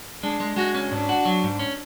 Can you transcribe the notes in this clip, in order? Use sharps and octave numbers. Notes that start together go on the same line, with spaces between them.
G#3 D4
G#3
G#3 F#4
C#4
G#2 D4
F#4
F#3
G#2
C#4